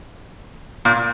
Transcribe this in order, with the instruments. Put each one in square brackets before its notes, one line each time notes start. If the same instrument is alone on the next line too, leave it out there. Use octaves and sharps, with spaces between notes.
[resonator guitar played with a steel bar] A#2